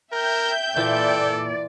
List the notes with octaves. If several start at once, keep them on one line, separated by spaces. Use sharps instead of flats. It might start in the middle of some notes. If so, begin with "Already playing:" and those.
A#4 E5 G5 G6
A#2 E3 F4 A4 D5 B5